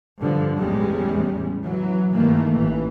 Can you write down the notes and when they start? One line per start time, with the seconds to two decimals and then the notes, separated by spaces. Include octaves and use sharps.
0.20 G2 D3 F3
0.57 A1 E2 G3 G#3 C#4
1.62 E3 F#3
2.13 G2 D#3 E3 A3 A#3
2.52 A1 E3